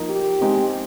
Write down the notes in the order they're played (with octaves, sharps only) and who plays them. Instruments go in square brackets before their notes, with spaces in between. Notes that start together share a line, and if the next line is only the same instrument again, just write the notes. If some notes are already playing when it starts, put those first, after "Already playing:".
Already playing: [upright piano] F3 A#3 D#4 A#4
[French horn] G4
[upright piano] G#3 C4 D#4